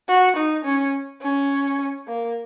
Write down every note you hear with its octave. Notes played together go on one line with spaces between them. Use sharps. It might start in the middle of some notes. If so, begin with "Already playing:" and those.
F#4
D#4
C#4
C#4
A#3